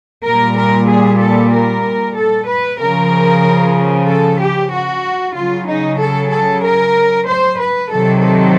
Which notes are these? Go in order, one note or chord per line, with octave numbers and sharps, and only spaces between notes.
A#2 G3 A#4
A#4
G#4
A4
A#4
A4
B4
C#3 F3 A#4
A4
G4
F#4
C#3 F#3 F4
D#4
A4
A4
A#4
C5
B4
C3 D#3 F#3 A4
A4